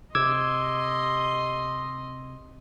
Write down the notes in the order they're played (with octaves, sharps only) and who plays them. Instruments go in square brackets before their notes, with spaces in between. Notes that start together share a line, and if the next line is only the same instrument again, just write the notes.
[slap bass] C3 [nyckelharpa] D#5 C6 [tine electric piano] D6 E6 G#6